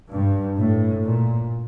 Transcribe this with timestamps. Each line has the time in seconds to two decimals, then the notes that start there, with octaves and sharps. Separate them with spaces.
0.11 G2
0.57 A2
1.03 A#2